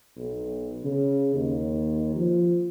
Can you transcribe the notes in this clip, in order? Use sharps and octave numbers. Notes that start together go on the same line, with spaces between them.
B1
C#3
D#2
F3